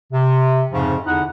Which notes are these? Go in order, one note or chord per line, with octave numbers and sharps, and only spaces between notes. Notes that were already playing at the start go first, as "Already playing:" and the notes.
C3
F2 G#2 C#3 F3
E2 D3 D#4 E4 F#5